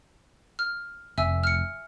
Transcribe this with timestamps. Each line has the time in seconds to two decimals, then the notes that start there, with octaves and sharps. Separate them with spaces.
0.59 F6
1.18 F1 E5 G#5 E6
1.44 F6 C#7